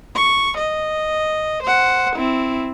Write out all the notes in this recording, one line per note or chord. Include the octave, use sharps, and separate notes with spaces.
C#6
D#5
C5 F#5
C4 E4